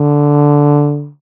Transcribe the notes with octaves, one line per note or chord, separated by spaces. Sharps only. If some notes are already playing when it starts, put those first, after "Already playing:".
Already playing: D3